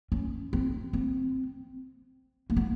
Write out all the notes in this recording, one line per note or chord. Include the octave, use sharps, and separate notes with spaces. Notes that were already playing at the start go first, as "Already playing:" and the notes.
C#4
C4
C4
A#3
B3